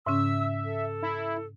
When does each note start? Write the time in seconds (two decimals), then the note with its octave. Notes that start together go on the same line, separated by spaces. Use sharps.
0.07 G#2 C#3 C#4 E5 E6
0.64 A4
1.02 E4